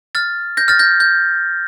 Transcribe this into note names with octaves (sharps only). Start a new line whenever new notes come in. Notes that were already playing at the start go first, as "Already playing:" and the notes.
F6 A6
G6 A#6
F6 A6
G6 A#6
G6